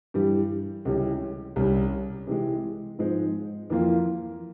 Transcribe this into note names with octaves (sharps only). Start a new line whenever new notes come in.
G2 E3 G3
C#2 C3 E3 G3 C#4
C2 C3 G3 C#4
C3 E3 G#3
G#2 F3 G#3 C4
F2 E3 A#3 F4